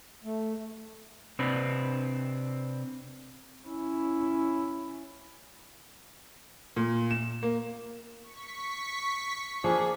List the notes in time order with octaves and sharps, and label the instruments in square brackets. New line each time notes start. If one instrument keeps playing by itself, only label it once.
[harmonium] A3
[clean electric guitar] C3 C4 D4 B4
[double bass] C#4 E4
[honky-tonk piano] A#2
E7
A#3
[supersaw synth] C#6 B6
[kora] F3 A#3 D4 [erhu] G#4